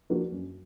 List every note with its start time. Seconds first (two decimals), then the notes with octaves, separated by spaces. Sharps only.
0.10 F3 A#3 D4 F#4
0.32 F#2